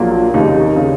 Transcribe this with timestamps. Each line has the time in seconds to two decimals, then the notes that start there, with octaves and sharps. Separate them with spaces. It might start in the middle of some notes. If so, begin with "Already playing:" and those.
Already playing: A#1 A#2 F#3 A#3
0.34 F1 D#2 C#3 D#4
0.76 C#3